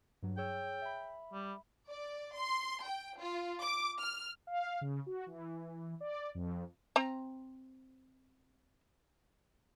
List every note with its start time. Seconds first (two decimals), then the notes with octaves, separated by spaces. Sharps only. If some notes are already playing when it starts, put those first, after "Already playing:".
0.22 G2 F#3
0.37 G#4 C#5 G5 E6
0.82 E5 B5
1.33 G3
1.88 D5
2.36 C6
2.84 G5
3.20 F4
3.62 D6
3.98 F6
4.47 F5
4.81 C#3
5.06 F#4
5.26 E3
6.01 D5
6.35 F2
6.96 C4 A#5